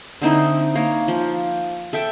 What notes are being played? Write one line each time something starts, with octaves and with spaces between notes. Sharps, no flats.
D3 C4 D#4 E4
A#3 C#5
F3
A4 E5 G5